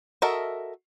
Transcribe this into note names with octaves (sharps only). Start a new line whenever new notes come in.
F#4 A4 A#4 D#5 E5